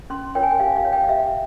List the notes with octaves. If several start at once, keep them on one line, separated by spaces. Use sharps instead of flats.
C#4 C6
F4 A#4 C#5 G5
G#5
G5
G4 F5
F5
C#5
G5
F5
G4 E5